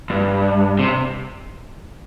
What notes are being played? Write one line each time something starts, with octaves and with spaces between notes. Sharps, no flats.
G2
C3